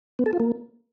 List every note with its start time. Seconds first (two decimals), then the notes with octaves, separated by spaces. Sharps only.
0.19 B3
0.26 A4
0.33 F4
0.40 A#3